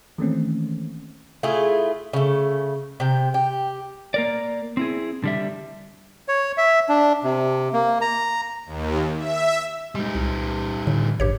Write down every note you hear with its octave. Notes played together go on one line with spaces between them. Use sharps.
D#3 E3 A3 A#3 C4 C#4
A3 E4 F4 G#4
C#3 A3
C3 G5
G4
A#3 A#4 D5
C4 E4 G#4
D3 G3 E5
C#5
E5
D4
C3
A#3
A#5
D#2
E5
G3 G#3 D#4
C2
A2 D3
A1 G2 G4 C#5